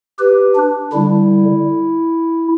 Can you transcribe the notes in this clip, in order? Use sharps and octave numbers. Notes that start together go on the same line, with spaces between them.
G4 B4
D4
D3 G3 E4